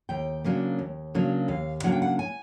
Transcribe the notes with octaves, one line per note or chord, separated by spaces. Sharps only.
D#2 G5
C#3 F#3 A#3 D4
D#2
C#3 F#3 A#3 D4
D#2 F5
C#3 F#3 A#3 D4 F#5
G5
F#5
G#5